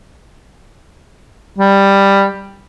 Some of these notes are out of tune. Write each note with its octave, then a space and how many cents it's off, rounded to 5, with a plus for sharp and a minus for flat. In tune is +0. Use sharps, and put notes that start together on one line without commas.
G3 +10